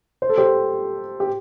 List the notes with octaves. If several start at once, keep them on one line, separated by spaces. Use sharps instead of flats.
C5
A4
G4 C5
G4